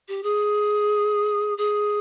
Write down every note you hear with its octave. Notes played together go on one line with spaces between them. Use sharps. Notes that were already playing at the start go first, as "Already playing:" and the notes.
G4
G#4
G#4